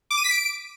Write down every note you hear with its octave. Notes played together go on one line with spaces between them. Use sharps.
D6
D#7
B6
D7